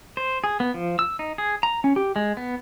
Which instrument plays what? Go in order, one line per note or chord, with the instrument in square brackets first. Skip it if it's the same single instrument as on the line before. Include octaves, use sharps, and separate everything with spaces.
[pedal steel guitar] C5
G#4
B3
F3
E6
D#4
G#4
A#5
C#4
G4
G#3
B3